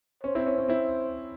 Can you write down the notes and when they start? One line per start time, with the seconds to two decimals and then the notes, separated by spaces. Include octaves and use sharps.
0.24 C#4 C5
0.35 C4 E4
0.46 C#4
0.58 C#4
0.68 C4 E4